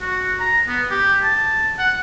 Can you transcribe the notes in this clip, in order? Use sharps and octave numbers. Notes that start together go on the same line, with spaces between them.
F#4
A#5
B3
G4
A5
F#5